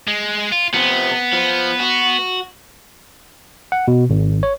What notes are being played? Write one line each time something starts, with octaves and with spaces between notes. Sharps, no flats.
G#3
F4
C3 F3 B3
F3
F#4
F#5
B2
G#1
C#5